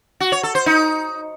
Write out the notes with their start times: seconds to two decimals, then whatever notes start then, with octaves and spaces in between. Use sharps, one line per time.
0.20 F#4
0.32 C#5
0.43 A4
0.55 C5
0.66 D#4